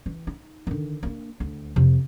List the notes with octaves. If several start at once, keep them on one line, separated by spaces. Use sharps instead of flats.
E3
D#4
D3 D#3
A#3 D4
D2
F2 C3